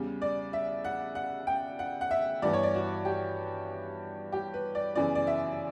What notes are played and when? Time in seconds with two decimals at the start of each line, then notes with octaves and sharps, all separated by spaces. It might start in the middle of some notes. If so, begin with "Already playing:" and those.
Already playing: E2 C#3 G3
0.22 D5
0.53 E5
0.85 F#5
1.15 F#5
1.47 G5
1.79 F#5
2.01 F#5
2.11 E5
2.42 G2 E3 B3 D5
2.53 C#5
2.63 D5
2.74 F#4
3.05 G4
4.32 G4
4.54 B4
4.75 D5
4.95 F#2 C#3 E3 B3 D5
5.15 D5
5.27 E5